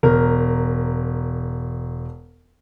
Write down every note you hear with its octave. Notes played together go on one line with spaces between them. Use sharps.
E1 A#4